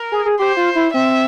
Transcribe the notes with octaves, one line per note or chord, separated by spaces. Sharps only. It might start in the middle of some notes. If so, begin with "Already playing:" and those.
Already playing: A#4
G#4
G#4
G4 C5
F4
E4
C4 E5